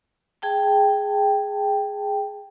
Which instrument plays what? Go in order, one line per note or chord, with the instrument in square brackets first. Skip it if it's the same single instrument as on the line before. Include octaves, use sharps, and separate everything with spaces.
[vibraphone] G#4 G5 A5